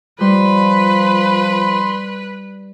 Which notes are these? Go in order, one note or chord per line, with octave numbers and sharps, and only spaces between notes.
F3 G3 B4 B5 C6